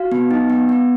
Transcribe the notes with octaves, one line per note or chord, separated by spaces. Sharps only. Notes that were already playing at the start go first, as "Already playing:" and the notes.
Already playing: F#4 F5
B3
D#4
B3
B3